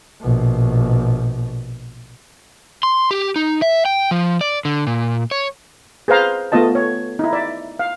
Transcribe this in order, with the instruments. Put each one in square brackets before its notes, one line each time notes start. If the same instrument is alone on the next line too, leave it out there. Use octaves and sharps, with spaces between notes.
[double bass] A#1 B2
[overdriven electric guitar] C6
G4
D#4
E5
G5
F3
D5
D3
A#2
C#5
[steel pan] G#4 B4 C5 F5 A#5
A3 B3 F4 D#5 A5
C#5
D#4 E4
D5 E5
F5